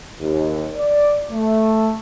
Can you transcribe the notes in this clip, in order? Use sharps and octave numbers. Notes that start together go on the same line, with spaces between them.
D#2
D5
A3